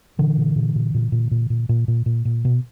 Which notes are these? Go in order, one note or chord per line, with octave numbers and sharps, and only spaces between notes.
A#2 D3 E3
A#2
A#2
A#2
A#2
A#2
A#2
A#2
A#2
A#2
A#2
A#2
B2